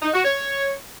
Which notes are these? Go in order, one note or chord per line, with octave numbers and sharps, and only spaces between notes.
D#4
F#4
C#5